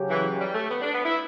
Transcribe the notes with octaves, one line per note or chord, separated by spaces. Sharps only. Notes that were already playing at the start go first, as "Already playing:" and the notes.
Already playing: C#3 F#3 C#4 G4
E3
G3
A3
B3
D4
B3
E4